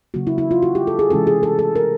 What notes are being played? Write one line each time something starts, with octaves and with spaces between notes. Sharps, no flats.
C#3 F#3 A#3 F#4
E4
E4
F4
F#4
G4
A4
G#4
C3 E3 G#3 C#4 E4 A4
G#4
A4
A4
A#4